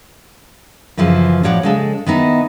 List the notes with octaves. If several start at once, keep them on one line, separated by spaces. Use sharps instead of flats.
F#2 C#3 E3 F3
A2 F3 C#5 D5 F#5
C#3 G#3 A4
D#3 B3 D#4 E4